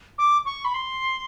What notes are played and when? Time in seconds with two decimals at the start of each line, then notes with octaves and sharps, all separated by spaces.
0.18 D6
0.45 C#6
0.65 B5
0.74 C6